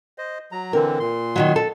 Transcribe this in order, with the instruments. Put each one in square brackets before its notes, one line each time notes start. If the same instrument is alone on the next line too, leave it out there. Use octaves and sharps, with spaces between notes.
[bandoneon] C5 D#5
F#3 A#5
[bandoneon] D3 E3 C4 [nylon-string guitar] A#4
[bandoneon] A#2 C6
[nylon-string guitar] D#3 E3 F#3
A4